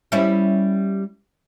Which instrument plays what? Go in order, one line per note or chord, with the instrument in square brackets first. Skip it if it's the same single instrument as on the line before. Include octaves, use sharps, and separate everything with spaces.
[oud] G3 C#4 E4